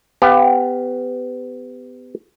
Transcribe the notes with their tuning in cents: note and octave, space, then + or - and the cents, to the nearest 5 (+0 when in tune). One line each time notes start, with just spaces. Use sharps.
B3 +30 G4 +20 F5 +0